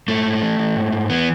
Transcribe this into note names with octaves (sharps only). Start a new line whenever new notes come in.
G#2 A3
G#2
E3
E3
G#2
G#2
E3 B3